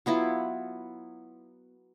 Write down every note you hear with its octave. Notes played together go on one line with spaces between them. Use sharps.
F#3 B3 E4 F4